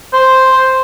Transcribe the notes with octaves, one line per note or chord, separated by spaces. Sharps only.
C5